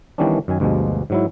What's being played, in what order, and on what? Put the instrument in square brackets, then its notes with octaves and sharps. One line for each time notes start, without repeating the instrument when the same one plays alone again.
[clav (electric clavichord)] D#3 E3 G3 B3 C#4 D4
F#2 D#3 G#5
D2 G2 B2 F3 G#3
G#2 F#3 E4